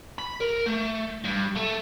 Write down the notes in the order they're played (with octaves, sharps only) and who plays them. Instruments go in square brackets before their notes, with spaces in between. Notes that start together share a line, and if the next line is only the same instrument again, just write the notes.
[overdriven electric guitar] B5
A#4
A3
G2
A3